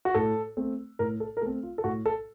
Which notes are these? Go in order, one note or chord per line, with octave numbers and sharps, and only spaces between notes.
F#4
A2 A4
A3 C4
A2 A#4
A4
A#4
A3 C4 A4
F4
A4
A2 F#4
A4